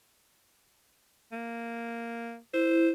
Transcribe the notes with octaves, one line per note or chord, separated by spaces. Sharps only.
A#3
E4 C5